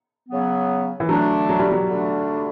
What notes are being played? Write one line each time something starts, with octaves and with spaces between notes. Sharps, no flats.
C#3 F#3 B3
E3
D3 F#3 A3 D4
F#3
G3
F#3
D3 A3 D4